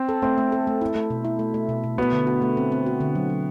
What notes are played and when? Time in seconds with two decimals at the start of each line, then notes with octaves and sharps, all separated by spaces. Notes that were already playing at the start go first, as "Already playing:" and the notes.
Already playing: C4
0.09 A4
0.22 A3 C4
0.38 A3
0.52 A4
0.67 A3
0.81 E4
0.95 A3
1.10 B2
1.25 E4
1.39 A3
1.54 A3
1.69 B2
1.84 B2
1.98 B3 F#4
2.12 D3
2.27 F#4
2.42 A3
2.57 C4
2.72 C4
2.86 F#4
3.00 D3
3.15 F#3
3.29 F#3